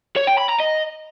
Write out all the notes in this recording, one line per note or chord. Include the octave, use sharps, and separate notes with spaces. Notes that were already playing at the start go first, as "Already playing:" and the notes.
C#5
G5
B5
A#5
D#5